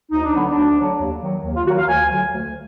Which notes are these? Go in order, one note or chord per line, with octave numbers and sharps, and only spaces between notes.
D2 D#4
D4
D3 F#3 B3
D4
D2
D3 F#3
D#2
D#3 F#3
D#2
F4
D#3 F#3 F#4
F5
D2 G#5
D3 F#3
D2